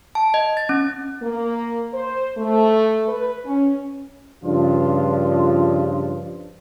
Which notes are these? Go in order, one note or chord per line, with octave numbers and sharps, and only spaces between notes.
A5
D#5
A6
C#4
A#3
C5
A3
B4
C#4
G2 C#3 F3 D4 F4